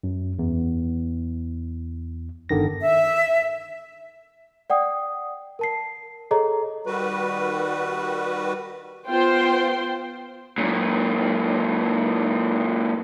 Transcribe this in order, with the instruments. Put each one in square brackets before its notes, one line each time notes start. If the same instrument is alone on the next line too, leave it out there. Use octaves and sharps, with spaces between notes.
[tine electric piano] F#2
E2
G1 D3 D#3 A#6
[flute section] E5
[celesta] D5 F#5 G5 D#6
A#4 A5 C7
G#4 A4 C#5 D#5 A#5
[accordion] D#3 G3 F#4 B4
[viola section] B3 F4 C5 G5 C6
[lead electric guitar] F#2 A#2